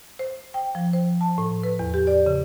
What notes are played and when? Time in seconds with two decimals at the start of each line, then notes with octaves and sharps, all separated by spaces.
0.19 C5
0.54 G5
0.75 F3
0.93 C5
1.21 A5
1.38 A2
1.63 B4
1.79 E2
1.94 G4
2.07 D5
2.26 C#3